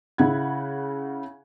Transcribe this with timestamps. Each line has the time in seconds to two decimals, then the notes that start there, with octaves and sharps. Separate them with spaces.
0.18 C#3 E4 F#5 B5 G#6